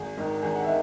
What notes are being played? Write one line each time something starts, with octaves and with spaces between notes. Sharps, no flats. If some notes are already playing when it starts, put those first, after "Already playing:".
Already playing: G#1 G#4
G#2 D#3
G#1 G#4
F#5
D#3 E5